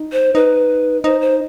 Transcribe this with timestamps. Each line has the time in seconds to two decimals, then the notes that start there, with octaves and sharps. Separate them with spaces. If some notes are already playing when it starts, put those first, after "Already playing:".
Already playing: D#4
0.12 C5
0.35 D#4 B4
1.04 D#4 C5
1.21 C5